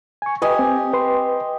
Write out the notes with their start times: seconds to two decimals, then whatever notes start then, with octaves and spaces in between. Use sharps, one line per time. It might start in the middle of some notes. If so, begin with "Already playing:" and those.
0.22 G#5 C#6
0.42 G4 B4 D#5 G#5
0.59 C4
0.93 B4 C6